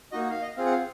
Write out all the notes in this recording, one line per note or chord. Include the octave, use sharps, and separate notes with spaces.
A#3 D#4 F#4 D#5
F5
D#5
C4 F4 G#4 F5
F#5
F5